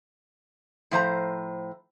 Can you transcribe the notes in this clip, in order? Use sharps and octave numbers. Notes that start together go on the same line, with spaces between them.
A2 F3 C5 A#5